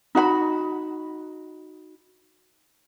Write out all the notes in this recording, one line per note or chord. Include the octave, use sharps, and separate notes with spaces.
D#4 F#4 F5 B5